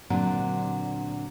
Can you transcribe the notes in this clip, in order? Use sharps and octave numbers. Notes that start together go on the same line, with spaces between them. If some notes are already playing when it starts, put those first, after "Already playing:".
A#2 D3 F#3 C4 D4